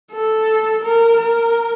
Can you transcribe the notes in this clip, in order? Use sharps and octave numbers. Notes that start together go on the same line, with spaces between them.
A4
A#4
A#4